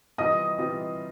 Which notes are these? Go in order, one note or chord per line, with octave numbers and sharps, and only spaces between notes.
C3 E3 G3 C4 F4 D#5 D#6
C3 E3 G3 C4 F4